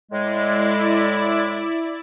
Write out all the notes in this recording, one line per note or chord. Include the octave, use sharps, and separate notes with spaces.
A2 G#3 E4 D5